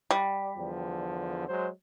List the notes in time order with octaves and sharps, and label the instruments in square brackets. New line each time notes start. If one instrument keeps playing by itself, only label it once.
[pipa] G3
[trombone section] E2 D3 F3
F#3 G#3 C5